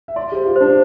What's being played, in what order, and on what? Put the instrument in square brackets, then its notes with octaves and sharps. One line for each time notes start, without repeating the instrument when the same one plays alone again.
[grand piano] E5
[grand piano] D5 [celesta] C6
[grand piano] G4
[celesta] C5
[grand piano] F4
[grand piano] D4 [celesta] C5